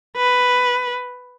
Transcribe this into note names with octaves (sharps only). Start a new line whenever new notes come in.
B4